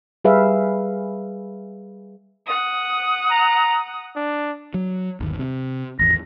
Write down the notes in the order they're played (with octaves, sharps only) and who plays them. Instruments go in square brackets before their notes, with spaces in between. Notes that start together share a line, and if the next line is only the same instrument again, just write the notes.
[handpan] G3 G#4 B4 E5 F5
[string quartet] F#5 D#6
[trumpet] A#5
D4
[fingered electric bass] F#3
G1 D#2
C3
[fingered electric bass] G#1 E2 [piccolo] A#6